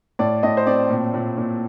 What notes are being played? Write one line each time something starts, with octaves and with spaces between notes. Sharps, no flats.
A2 D5
A2 D#5
C5
C4 D5
A#2
A#2
A#2